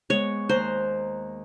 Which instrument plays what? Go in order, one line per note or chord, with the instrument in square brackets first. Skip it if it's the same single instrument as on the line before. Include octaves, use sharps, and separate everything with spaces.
[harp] G#3 B3 [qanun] C#5
[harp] D#2 A#5 F#6 [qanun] C5